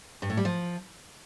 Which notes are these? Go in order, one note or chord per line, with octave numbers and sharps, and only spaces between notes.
G2
A2
G3
F3